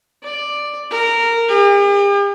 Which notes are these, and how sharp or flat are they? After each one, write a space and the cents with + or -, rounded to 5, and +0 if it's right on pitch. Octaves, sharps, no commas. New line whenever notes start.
D5 +5
A#4 -15
G4 +45